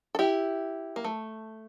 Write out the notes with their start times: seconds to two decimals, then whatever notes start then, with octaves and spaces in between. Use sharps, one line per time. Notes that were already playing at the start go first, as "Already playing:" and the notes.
0.15 A4
0.19 E4 G4
0.96 A#3
1.05 A3